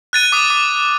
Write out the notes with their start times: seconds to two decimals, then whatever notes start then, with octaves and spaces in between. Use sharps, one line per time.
0.13 F#6 A6 D#7
0.32 D6 D#6
0.50 D6